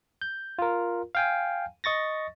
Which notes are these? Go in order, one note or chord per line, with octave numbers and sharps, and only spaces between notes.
G6
F4 A#4
F5 G5 G#5
D#5 C#6 A6 A#6